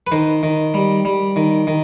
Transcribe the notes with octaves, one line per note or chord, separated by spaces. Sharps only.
B4
D#3 C5
D#3
G3
G3
D#3
D#3